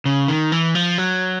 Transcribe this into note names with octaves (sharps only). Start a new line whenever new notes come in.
C#3
D#3
E3
F3
F#3